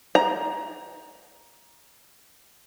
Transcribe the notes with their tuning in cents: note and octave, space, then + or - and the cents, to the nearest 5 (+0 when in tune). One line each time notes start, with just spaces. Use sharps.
A#5 +20